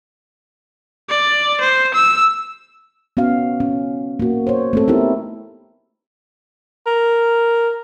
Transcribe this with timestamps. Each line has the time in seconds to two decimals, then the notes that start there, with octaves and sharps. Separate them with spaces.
1.09 D5
1.61 C5
1.94 E6
3.17 B3 C#4 F#4 F5
3.60 C#4
4.20 A#3 F#4
4.47 C5 C#5
4.73 A3 C4 A4
4.88 B3 D#4 E4 G4 A#4
6.86 A#4